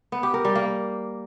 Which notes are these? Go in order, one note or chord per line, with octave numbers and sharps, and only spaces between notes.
B3
G4
A#4
G3
A#3